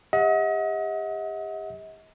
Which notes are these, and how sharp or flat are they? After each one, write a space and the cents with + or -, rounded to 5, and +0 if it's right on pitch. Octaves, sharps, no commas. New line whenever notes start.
G4 +35 D#5 +40 F#5 -25